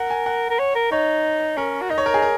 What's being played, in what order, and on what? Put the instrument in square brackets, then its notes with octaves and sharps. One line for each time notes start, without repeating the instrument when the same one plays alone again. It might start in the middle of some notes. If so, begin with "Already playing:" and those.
Already playing: [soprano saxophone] A#4 [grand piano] F#5
[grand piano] G#5
F#5
[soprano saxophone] A#4
C#5
A#4
[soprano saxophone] D#4 [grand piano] C#5
[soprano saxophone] C#4 [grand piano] A#4
[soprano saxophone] F#4
[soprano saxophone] D#4 [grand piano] D#5
[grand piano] C#5
A#4
G#4
A#4